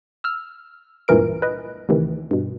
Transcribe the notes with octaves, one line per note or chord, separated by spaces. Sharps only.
E6 F6
C#2 G2 A#2 E3 A#4 D7
B4 D#5
D2 C3 D#3 E3
G2 B2